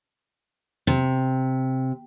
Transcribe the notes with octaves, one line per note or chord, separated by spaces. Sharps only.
C3